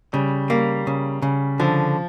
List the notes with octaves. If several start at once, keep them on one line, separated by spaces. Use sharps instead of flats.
C#3 G3
G3 A#3
C#3
C#3
D3 F3